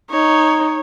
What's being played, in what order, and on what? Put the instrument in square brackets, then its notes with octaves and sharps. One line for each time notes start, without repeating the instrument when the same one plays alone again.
[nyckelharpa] D#4 [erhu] C#5